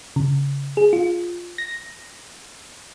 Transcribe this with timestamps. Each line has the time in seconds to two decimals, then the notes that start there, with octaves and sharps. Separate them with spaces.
0.16 C#3
0.77 G#4
0.93 F4
1.58 A#6